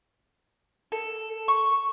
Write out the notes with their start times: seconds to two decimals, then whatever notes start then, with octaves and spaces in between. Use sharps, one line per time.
0.92 A4
1.48 C#6